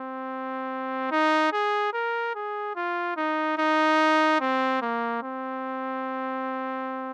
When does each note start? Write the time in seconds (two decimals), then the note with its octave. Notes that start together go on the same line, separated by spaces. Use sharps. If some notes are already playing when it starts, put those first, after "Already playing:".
Already playing: C4
1.11 D#4
1.53 G#4
1.93 A#4
2.35 G#4
2.76 F4
3.17 D#4
3.58 D#4
4.41 C4
4.82 A#3
5.23 C4